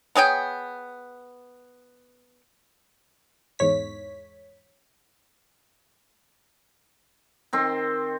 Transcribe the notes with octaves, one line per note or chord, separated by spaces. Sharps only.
B3 G#4 C#5 G5
E2 G#2 C#5 B6
D#3 C4 C6